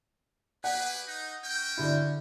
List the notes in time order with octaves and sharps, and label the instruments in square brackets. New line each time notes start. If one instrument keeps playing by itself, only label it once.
[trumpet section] G4 G#4 B4 [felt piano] F#5
[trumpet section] D#4
C#4 F#4 G5
[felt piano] D3 E4